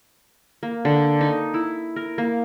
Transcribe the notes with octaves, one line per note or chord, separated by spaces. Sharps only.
A#3
D3
D#4
E4
A#4
A#3